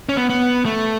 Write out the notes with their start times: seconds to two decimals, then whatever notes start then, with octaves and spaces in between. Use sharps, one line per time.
0.09 C#4
0.17 B3
0.30 B3
0.65 A3